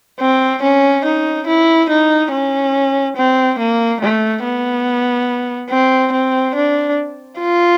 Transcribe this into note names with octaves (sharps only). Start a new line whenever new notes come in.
C4
C#4
D#4
E4
D#4
C#4
C4
A#3
A3
B3
C4
C4
D4
F4